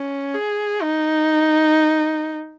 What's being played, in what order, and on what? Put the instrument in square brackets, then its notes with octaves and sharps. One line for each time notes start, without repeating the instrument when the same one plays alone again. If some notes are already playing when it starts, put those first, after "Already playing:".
Already playing: [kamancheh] C#4
G#4
D#4